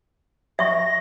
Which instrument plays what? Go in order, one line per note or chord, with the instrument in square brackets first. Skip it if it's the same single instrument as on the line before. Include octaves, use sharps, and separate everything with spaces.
[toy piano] E5 C#6 [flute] A#6